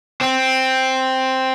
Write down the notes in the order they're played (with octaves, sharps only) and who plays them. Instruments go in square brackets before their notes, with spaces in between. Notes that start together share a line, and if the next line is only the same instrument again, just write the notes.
[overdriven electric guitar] C4